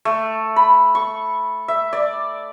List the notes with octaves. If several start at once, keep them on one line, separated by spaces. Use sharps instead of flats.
A3
B5
C#6
E5
D5